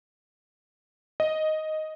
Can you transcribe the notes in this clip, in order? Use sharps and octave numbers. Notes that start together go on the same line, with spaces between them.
D#5